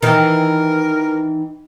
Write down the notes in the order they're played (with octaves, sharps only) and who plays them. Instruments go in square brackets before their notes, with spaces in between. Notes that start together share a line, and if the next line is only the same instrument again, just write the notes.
[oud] D#3 E3 [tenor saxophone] A#4